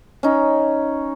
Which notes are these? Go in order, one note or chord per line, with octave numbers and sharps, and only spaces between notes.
C#4 D#4